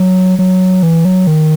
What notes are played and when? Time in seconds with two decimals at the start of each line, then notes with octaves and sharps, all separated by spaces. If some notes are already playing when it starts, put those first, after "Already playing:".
Already playing: F#3
0.39 F#3
0.83 E3
1.05 F#3
1.27 D#3